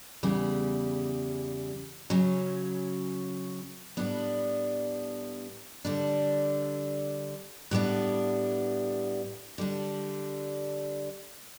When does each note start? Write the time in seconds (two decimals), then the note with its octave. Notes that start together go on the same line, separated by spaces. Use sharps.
0.23 E2 C#3 G3
2.10 C#3 F#3 C#4
3.97 A2 G3 B3 D4
5.85 D3 G3 D4
7.71 A2 G3 B3 D4
9.58 D3 G3 D4